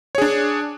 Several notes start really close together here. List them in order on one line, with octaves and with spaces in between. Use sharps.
C#5 G#4 D4